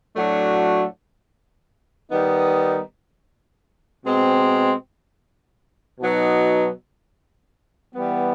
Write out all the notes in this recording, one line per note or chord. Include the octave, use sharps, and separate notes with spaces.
A2 F#3 A3 D4 F#4
D#3 G3 B3 D#4
B2 G#3 C4
B2 F#3 B3 D#4
E3 G3 B3